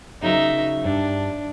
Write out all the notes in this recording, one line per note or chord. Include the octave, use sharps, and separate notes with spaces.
C#3 F#3 D#4 A#4 E5
G2 D4